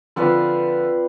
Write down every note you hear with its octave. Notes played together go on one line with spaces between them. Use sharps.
D3 F3 C4 F4 B4 D5